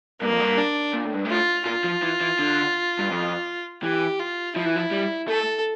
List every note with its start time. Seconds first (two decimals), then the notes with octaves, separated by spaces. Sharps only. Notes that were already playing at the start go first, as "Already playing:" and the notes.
0.21 G2 A#3
0.31 F2
0.40 G2
0.57 D4
0.94 A#2
1.05 A2
1.14 G2
1.25 A2 F4
1.66 A#2 F4
1.84 F3
2.02 E3
2.21 E3
2.39 D3
2.99 G2
3.11 F2
3.83 E3 G4
4.19 F4
4.56 F3 E4
4.66 E3
4.76 F3
4.91 G3
5.28 A3 A4